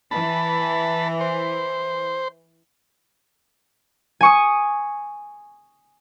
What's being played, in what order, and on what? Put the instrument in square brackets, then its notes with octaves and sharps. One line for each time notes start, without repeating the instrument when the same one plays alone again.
[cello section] E3 [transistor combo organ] A5 B5
[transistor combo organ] C5
[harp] G#5 C#6 D#6